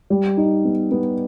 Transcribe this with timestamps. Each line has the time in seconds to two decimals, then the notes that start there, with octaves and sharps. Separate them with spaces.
0.10 G3
0.37 D#4
0.65 B3
0.91 B3